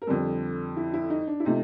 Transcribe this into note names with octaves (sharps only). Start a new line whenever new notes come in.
A#4
F2 D3 G3 A4
E4
E4
D#4
D4
E4
C3 F3 A3 D#4